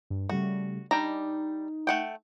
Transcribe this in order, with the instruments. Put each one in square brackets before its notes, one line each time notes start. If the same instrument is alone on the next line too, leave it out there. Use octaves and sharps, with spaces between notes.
[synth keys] G2
[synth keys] C#3 G3 A3 [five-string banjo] F#4
[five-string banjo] G3 D4 A#5 [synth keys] D#4
[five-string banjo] A3 F#5 G5